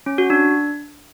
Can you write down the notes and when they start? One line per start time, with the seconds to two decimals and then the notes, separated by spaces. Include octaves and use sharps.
0.06 C#4
0.18 F#4
0.30 D4